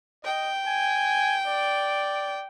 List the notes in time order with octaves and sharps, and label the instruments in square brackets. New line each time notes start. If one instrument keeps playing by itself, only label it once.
[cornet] D#5 [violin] G5
[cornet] G#5
D5